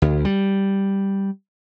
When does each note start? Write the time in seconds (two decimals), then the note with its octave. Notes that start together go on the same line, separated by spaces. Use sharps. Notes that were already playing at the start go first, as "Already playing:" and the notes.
0.02 D2
0.25 G3